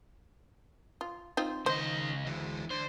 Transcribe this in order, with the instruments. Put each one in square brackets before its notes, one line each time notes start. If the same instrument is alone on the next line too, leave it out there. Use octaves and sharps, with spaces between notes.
[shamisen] F4
C4 D#4 F4
[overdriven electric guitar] C#2 D#5 [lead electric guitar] D#3 [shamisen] C5
[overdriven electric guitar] D2 [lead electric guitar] E3 G#3
[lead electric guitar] D3 [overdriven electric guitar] C5